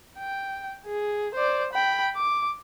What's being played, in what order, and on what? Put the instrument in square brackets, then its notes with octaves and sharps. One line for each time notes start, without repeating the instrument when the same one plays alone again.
[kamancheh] G5
G#4
C5 D5
G5 B5
D6